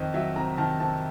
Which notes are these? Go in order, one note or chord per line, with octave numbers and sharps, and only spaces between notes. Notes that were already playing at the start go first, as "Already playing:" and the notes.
Already playing: F2 D#3 D#5
F#3 E5
C3 A#5
D#3 A5
C3 A5